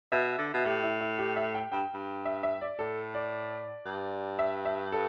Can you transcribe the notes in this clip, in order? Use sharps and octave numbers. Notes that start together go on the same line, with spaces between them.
B2 E5
D3
B2
A2 G4
E4
E4
G4
E5
G5
G2 G5
G2
E5
E5
D5
A2 A4
D5
G2
E5
E5
A4